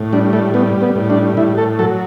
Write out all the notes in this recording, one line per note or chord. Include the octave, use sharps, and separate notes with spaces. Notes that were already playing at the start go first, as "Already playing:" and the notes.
Already playing: A2
G3 D4
A3
G3 B3
B3
A2
D4
A2 E4
A4
F#3 A4